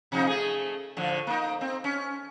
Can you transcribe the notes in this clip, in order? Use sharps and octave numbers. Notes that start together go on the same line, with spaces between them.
C3 F3 D#4
A3 G#4
A2 D3 F3
A#3 D#4
C4
C#4